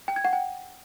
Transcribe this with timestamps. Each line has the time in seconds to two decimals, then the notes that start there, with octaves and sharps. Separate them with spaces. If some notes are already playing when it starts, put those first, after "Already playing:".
0.08 G5
0.16 G#6
0.25 F#5
0.33 G5